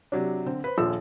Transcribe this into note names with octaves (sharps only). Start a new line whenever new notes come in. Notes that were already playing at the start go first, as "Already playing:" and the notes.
C3 F#3 D4
D3 C4
B4 C5
D#1 A#1 F4 E6